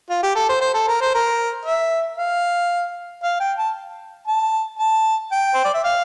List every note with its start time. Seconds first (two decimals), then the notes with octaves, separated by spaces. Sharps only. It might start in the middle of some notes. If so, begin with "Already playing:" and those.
0.10 F4
0.23 G4
0.35 A4
0.49 C5
0.61 C5
0.74 A4
0.88 A#4
1.01 C5
1.14 A#4
1.65 E5
2.18 F5
3.23 F5
3.40 G5
3.58 A5
4.27 A5
4.79 A5
5.32 G5
5.54 C5
5.64 D5
5.74 E5
5.84 F5